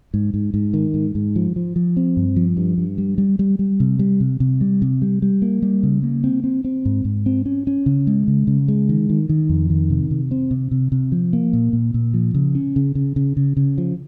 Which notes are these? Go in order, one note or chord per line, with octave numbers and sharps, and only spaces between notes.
G#2
G#2
G#2
D#3
G#2
G#2
F3
F3
F3
C4
G2
F3
G2
G2
G3
G3
G3
G3
C3
G3
C3
C3
G3
C3
G3
G3
A#3
G3
C#3
A#3
C4
C4
C4
G#2
G#2
C4
C#4
C#4
C#3
G#3
C#3
C#3
G#3
D#3
D#3
D#3
F2
D#3
C3
C3
C4
C3
C3
C3
F3
A#3
A#2
A#2
A#2
F3
C#3
C#4
C#3
C#3
C#3
C#3
C#3
F3